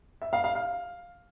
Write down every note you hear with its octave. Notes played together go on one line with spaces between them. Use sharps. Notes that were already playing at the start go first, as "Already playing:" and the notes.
E5
F5
F5
F5